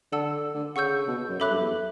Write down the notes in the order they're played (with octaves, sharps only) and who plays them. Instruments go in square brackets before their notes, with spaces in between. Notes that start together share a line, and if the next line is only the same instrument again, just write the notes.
[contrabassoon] D3 [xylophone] A4 D5 F#5 A5 E6
[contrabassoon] D3
[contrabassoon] C#3 [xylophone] F#5 C#6 E6 G6
[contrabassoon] B2
F#2
[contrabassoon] F#2 [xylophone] A4 E5 B5 D6 F#6
[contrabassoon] G2
E2